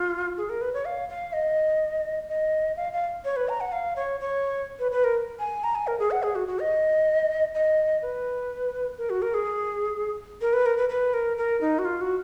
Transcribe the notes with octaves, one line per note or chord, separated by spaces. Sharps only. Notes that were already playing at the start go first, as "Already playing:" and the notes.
Already playing: F4
G#4
A#4
B4
C#5
F5
F5
D#5
D#5
F5
F5
C#5
B4
A#5
F#5
F5
C#5
C#5
B4
B4
A#4
G#5
A#5
G#5
A#4
G#4
F#5
G#4
F#4
F#4
D#5
D#5
B4
A#4
F#4
A#4
G#4
A#4
B4
A#4
B4
B4
A#4
A#4
D#4
F#4
F4
F#4